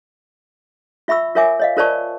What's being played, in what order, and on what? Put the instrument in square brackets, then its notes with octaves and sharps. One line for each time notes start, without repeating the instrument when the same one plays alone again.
[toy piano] F4 E5 B5 C#6 E6
F4 A#4 C#5 E5 G#5 D6
C#5 D#5 F5
F4 A#4 C5 D5 A5 C#6